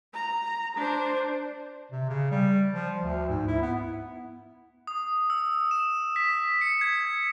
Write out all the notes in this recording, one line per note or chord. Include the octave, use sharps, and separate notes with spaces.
A#5
D4 C5
C3
C#3
G3
F3
D2
G#2
E4
B3
D#6
E6
E7
B6
C#7
G#6